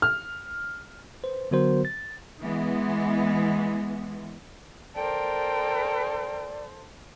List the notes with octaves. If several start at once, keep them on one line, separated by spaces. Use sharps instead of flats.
F6
B4 C5
D3 F#3 B3 F#4 A#4 C5
A6
E3 G#3 B3
A4 A#4 C5 D5 G5